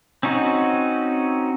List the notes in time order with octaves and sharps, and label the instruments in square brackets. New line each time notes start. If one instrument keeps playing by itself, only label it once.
[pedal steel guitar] C4 C#4 D#4 F#4